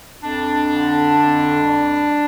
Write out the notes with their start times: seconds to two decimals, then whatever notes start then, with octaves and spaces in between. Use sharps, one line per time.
0.23 F2 D4
0.70 D3
1.16 F2
1.63 G3